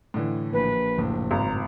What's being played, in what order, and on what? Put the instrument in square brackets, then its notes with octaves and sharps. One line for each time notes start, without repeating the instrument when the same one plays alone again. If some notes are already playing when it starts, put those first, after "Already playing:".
[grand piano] A2 D3 E3
[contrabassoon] A#1 [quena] B4
[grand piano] F#1 A2
[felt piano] G#1 [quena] A#5